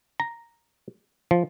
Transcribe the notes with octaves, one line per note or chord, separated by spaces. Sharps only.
A#5
F3